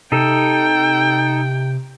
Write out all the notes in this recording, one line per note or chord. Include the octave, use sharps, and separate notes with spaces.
C3 D#4 A4 G5